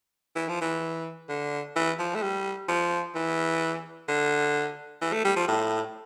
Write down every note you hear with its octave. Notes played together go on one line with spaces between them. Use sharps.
E3
F3
E3
D3
E3
F3
A3
G3
F3
E3
D3
E3
A3
G3
F3
A2